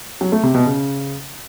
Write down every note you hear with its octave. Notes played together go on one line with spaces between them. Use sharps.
F#3
A3
C3
B2
C#3